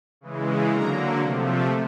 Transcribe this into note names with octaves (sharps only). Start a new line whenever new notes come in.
C#3 E3 G#3
D3 F#3 A#3 A#4 A#5
C3 F3 A3